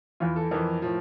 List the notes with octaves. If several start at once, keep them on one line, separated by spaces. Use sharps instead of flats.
E2 E3 F4
A4
F2 E3 A#4
A2 F3